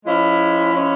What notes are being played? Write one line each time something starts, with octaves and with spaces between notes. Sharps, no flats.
F3 G#3 C#4 E4
F3 G#3 C#4 E4